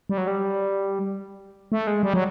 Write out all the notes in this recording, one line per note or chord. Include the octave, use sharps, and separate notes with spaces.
G3
F#3
G3
A3
G#3
G3
F#3